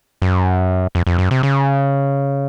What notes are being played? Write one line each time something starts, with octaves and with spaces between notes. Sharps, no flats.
F#2
F2
F2
F#2
C3
C#3